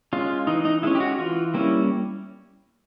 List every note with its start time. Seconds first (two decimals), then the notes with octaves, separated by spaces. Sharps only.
0.13 G#3 C#4 F4
0.47 E3 D#4
0.65 D#4
0.83 G#3 C#4 E4
0.95 G4
1.00 F#4
1.19 E3 F4
1.54 G3 A#3 C#4 E4